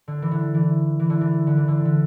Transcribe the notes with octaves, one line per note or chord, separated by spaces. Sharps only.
D3
E3
D3
E3
E3
D3
E3
D3
E3
D3
D3